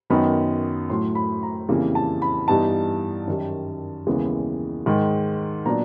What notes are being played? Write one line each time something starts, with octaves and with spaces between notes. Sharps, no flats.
F#2 D#3 F#3 B3 D#4 B5
A2 F#3 A3 C6
B5
A#5
F2 C#3 E3 G3 A#3
A5
B5
G2 E3 G3 B3 D#4 A5
F#2 D#3 G3
D#2 C#3 E3 G#3 B3
G#2 D#3 G#3
A#2 F#3 B3 D4 A#5